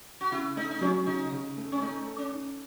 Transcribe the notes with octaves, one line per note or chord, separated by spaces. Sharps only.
F#4
C#3 E4
A3 D#4
D#4
F#3 C#4
C#3 D#4
C#3
A3
C#4
A3 D#4
A4
C#4
D#4